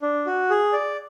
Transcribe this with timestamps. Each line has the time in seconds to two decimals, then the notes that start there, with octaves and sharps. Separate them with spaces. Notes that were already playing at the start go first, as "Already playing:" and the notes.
0.02 D4
0.27 F#4
0.50 G#4
0.73 D5